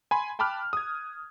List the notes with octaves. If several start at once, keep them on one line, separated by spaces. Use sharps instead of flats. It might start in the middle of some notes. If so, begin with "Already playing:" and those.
G#5 B5 C6
G5 A5 B5 D6 F6 F#6
D#6 G#6